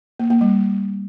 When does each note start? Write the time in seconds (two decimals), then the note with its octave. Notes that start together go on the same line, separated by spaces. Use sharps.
0.20 A#3
0.30 A#3
0.41 G3